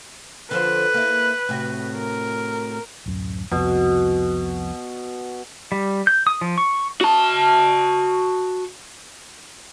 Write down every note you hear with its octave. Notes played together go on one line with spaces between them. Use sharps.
D3 F3 B4 C5
A#3 E4
A2 C3 F#4
A#4
D1 F#2
C2 F2 B2
G3
G6
D#6
F3
C#6
F#4 A5